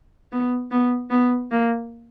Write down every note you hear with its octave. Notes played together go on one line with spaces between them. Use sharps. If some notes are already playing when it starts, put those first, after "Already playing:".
B3
B3
B3
A#3